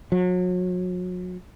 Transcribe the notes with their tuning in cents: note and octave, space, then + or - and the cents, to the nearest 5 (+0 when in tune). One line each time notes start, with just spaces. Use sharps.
F#3 -35